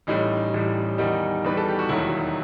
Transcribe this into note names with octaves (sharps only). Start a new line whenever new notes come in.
A1 A2 G3 D#4
A1 A2 G3
E2 D#3 G3 D#4
E2 D#3 G3 B4
A4
G4
F#4
E1 D#2 D#3 F#3 E4